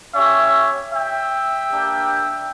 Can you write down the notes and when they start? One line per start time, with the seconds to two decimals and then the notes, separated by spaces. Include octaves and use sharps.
0.15 C#4 G4 C#5 E5
0.93 E5 G5
1.71 A#3 D4 G4